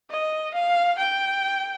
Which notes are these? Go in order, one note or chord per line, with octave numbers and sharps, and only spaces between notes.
D#5
F5
G5